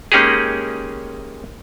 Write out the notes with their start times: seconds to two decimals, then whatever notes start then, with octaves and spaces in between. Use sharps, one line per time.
0.12 G#3 A#3 C#4 D#4 G4 G#4